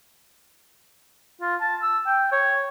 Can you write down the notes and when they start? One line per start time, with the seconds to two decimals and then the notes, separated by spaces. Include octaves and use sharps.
1.41 F4
1.61 A5
1.82 E6
2.06 G5
2.32 C#5